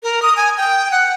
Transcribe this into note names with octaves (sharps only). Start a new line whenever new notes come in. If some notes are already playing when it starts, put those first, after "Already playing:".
A#4
D#6
G#5
G5
F#5